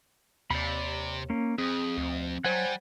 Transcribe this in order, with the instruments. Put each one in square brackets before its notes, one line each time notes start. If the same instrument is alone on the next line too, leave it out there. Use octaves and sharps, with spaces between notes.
[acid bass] D#2 [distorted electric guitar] C3 [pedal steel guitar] D5 B5
[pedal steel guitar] A#3 C#4
[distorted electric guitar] F2 [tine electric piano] C4 [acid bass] G#4 [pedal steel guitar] D#6
[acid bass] D2
[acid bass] F#3 [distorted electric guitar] G3 [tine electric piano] C5 G#6 [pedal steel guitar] F#5 G#5